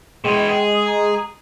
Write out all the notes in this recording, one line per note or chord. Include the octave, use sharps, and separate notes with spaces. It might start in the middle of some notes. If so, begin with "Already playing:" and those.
B2 G#3 E4 G5
G#4
D#6
A#5